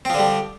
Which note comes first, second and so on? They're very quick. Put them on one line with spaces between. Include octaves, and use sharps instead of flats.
C4 F3 D3 G3